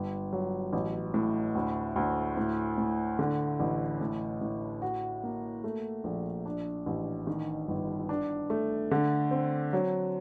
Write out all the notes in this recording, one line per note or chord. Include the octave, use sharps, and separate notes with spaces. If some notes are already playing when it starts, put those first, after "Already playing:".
Already playing: G1
F#3
A1
A2
D2
D2
A2
A2
D3
A1
A2
A2
F#4
A#3
A3
A#1
D4
A1
D#3
G1
D4
A3
D3
C4
F#3